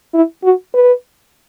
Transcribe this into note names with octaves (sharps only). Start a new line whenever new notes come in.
E4
F#4
B4